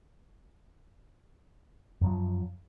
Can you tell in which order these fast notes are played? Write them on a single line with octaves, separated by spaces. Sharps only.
F#2 F#3 F3